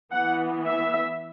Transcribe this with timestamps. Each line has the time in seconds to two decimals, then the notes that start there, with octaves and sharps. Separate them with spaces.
0.12 E3 B3 F#5
0.65 E5